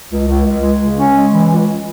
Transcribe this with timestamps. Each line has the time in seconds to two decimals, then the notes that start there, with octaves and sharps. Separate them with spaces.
0.11 C#2
0.28 C#2
0.45 C#2
0.63 G#3
0.80 C#3
0.98 C#4
1.15 G#3
1.33 E3
1.51 C#2